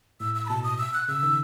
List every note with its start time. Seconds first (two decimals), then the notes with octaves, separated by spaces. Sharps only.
0.20 A2 E6
0.35 E6
0.46 B5
0.49 B2 A5
0.64 D#6
0.78 E6
0.94 F#6
1.08 C#3 E6
1.23 D#3